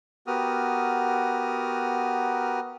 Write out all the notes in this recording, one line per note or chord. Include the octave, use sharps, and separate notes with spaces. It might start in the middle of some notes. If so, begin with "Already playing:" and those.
B3 F#4 G4 A#4 D#6 F6